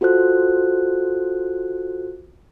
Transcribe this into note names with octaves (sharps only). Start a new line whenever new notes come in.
F4 F#4 A4 C5 F#6